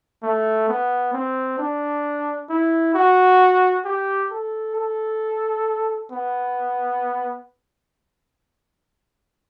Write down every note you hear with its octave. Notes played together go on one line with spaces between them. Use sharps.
A3
B3
C4
D4
E4
F#4
G4
A4
A4
B3